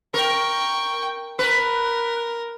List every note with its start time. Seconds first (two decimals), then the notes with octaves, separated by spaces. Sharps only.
0.14 A#4 G5 C#6
1.39 A#4 B4